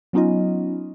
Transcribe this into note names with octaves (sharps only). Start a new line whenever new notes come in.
F#3 B3 C#4 D#4 F4 D#5